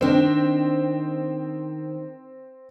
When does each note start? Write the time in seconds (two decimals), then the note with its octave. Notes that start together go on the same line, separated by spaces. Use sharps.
0.01 D#3 C4 D4